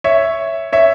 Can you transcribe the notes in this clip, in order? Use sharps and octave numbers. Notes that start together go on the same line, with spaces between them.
C#5 E5
C#5 E5